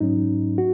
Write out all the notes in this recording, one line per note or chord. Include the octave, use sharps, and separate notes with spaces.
G#2 F#3 C#4 D#4
F#4